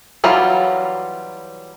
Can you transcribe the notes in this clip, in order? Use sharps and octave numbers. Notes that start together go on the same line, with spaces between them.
E3 F#3 G3 C#4 F4